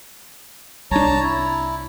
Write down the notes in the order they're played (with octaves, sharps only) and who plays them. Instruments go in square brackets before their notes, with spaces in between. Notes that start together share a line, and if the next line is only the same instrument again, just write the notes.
[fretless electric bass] C2 D4 [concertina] C#5 A5 A#5
[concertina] E4